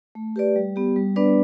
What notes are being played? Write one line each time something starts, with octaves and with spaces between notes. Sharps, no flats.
A3
G4 B4 D5
G3
B3 G4
G3
B3 D4 B4 D5